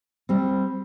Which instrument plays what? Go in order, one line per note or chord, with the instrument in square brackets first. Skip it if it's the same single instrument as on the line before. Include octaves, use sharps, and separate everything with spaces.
[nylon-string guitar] G3 C4